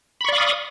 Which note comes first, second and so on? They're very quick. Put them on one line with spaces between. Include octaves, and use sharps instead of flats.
B5 C#6 D5 F5 D#6